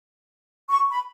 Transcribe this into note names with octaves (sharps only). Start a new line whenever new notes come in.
C#6
B5